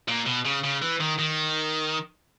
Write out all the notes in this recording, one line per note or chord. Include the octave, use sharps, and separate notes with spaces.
A#2
B2
C#3
C#3
E3
D#3
D#3